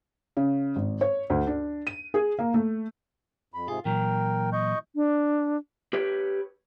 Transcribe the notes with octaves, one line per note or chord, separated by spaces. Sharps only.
C#3
G#1
C#5
D2
D4
D#7
G#4
A#3
A3
F2 B5
G#2 C3 F4 G#4
A#2 E3 F#3 A#4 G5
D#5 C#6 G6
D4
G4 B4 C#5